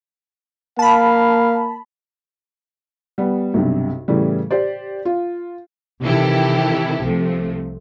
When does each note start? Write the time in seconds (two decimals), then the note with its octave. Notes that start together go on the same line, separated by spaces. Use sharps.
0.79 A#3 F5 A5 B5
3.18 G3 B3
3.54 B1 G2 C3
4.08 A2 C#3 E3 G3
4.51 G4 C5 D5
5.05 F4
6.02 C3 D#3 E3 E4 G4 A4
7.01 C2 C3 F3 A3